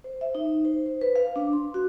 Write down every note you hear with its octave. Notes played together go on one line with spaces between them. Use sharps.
C5
E5
D#4
C5
C5
B4
F5
D4
C6
F#4